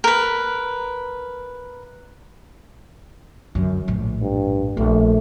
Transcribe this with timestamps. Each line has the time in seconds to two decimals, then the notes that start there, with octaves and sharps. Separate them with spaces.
0.04 A#4 B4
3.55 F#2 D3
3.88 A#1 A2
4.22 G2
4.77 A#1 A3